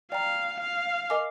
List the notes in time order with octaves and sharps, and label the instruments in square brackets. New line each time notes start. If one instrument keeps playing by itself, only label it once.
[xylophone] D5 G5 A#5 F6 [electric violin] F5
[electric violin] F5
[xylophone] A#4 D#5 G#5 D6